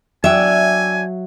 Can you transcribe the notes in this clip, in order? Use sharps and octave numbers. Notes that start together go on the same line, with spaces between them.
F#3 D4 E5 G5 G#5